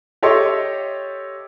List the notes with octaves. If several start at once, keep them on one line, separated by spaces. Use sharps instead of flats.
G4 A4 C#5 D#5 E5 C6